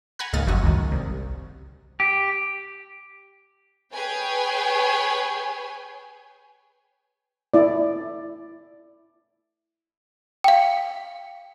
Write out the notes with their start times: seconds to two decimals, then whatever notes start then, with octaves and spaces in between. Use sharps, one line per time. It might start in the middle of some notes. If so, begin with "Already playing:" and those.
0.19 F#5 G#5 A#5 B5 F#6
0.33 C#2 G#2 A#3 D#6 F6 A6
0.47 G1 F#2 F3 F#4 D#5 E6
0.63 C#2 D#3
0.92 C2
2.00 G4
3.92 G#4 B4 C#5 G5 G#5
7.54 E4 D5
10.44 F5 G5